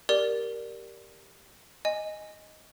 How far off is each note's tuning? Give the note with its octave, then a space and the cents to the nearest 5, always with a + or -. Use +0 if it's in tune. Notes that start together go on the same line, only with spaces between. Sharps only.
G4 +0 A#4 +0 D5 +0
D#5 +0 G#5 +0